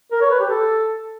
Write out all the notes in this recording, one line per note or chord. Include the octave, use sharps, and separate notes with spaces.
A#4
C#5
B4
G4
A4